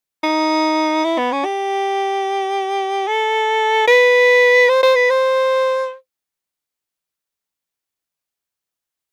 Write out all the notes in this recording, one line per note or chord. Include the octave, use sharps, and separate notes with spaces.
D#4
E4
B3
C#4
G4
A4
B4
C5
C5
B4
C5